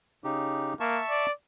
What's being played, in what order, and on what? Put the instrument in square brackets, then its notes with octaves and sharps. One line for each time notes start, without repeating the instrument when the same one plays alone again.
[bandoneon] C#3 D#4 G4
[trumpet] A#3 [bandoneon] E5 A5 C#6
[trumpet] D5